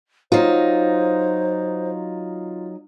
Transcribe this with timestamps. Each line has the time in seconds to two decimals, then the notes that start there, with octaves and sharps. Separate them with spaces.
0.32 F#3 D#4 F4 C5